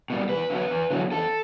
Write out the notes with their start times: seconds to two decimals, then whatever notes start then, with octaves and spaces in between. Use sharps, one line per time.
0.10 B2 G3
0.29 E2 B4
0.50 D3 F#3 B3
0.71 E2
0.90 D3 F#3 B3
1.11 E2 A4